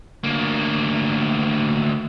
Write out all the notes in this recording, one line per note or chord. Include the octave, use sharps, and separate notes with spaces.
D2 A#3